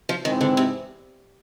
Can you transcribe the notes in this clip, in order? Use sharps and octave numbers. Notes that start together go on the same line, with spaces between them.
F3
G#2 D#3 E3 G#3 C4
D3
C3